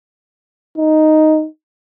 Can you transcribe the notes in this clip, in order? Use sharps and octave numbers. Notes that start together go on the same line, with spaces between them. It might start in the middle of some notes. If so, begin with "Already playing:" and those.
D#4